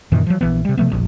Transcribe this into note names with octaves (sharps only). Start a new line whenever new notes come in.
F#2 A#2 D#3 E3
F3 F#3
A#1 E3 B3
C3 G3
C3 F3 A3 B3
F1 A#1